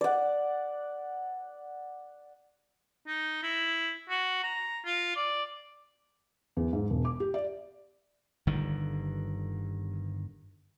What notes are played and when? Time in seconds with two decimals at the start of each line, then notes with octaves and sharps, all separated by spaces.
0.01 D5 F#5
3.07 D#4
3.43 E4
4.09 F#4
4.43 A#5
4.85 F4
5.16 D5
6.57 E2
6.73 G#2
6.90 E1
7.05 D6
7.20 G4
7.34 D5
8.47 G1 D3 D#3